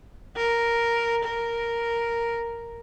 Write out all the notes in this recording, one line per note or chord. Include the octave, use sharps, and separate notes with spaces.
A#4
A#4